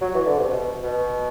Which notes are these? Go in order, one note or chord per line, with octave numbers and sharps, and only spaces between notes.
F#3
E3
D3
C3
B2
B2